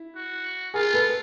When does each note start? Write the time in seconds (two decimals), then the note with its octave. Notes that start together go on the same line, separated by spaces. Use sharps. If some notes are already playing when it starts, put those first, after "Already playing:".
Already playing: E4
0.16 F#4
0.74 F4 G#4 A#4
0.93 A4 B4